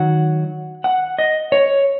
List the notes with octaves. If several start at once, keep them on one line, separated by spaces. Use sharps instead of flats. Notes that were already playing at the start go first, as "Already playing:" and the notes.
Already playing: D#3 F#3 D#4 F#5
F#5
D#5
C#5